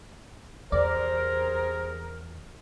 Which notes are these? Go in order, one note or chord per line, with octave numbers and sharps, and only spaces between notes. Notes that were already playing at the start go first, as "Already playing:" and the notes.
E2 C3 G#4 A#4 C5 D5